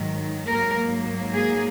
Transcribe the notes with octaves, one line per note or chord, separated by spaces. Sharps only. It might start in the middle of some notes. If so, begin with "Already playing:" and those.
Already playing: G#2 D#3 F#3
G#2 F#3 A#3 A#4
G#4